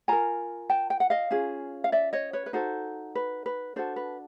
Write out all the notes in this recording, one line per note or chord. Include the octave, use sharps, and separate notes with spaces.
F4 A#4 G#5 A#5
G5 A5
G5
F#5
D#5 F5
C#4 F4 G#4
F5
D5 E5
C#5 D#5
B4 C#5
B4
D#4 F#4 A4 C5
B4
B4
D4 F#4 A4 C5
B4